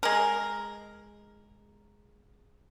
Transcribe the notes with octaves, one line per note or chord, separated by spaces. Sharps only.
G#3 A#4